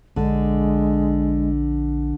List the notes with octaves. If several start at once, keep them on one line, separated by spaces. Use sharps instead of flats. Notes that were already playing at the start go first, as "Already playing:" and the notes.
A#1 D3 G#3